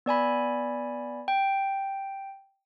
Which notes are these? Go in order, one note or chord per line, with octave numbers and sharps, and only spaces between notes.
B3 D5 G#5 B5
G5